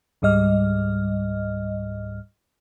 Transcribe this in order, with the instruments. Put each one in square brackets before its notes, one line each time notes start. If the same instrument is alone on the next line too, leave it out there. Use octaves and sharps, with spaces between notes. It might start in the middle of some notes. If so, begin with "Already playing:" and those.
[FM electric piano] C#2 G#2 G3 D#5 F6